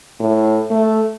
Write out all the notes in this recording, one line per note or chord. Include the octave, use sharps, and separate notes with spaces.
A2
A3